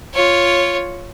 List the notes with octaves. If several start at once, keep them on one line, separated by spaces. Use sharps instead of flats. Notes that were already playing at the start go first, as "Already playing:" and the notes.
F4 C#5